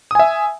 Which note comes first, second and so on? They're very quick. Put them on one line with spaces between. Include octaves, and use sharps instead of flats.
D#6 G#5 E5